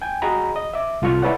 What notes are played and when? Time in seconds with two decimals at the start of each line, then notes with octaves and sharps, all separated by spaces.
0.02 G5 G#5
0.22 F#4 G#4 D#5 A#5 B5
0.56 D#5
0.74 E5 D6
1.02 C2 F4 A4 C#6 F6
1.22 E4 A4 B4 C#5 D5 F#5